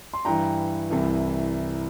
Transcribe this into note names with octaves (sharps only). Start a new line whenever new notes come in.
C6
G2 E3 G5 A#5
C2 C3 E3